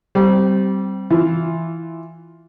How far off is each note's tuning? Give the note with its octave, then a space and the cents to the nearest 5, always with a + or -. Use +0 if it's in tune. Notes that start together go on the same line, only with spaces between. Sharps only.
G3 -20 C4 +0
E3 +0 F4 +0